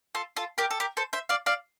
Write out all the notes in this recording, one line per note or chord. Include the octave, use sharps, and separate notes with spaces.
F4 A4
F4 A4
G4 A#4
A4
G4 A#4
A4 C5
C5 E5
D5 F5
D5 F5